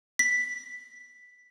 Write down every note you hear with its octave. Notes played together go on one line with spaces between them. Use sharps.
B6